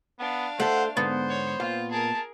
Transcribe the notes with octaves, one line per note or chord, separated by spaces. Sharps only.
B3 D4 F5
A3 A4 C5 F#5
G#2 D3 B3 C5
C#5
A#2 F4 F5
G#4 A#4 A5